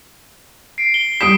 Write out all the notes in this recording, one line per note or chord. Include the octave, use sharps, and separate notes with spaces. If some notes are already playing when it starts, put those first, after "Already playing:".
C7 D7
G7
G3 D#6 B6 D7 E7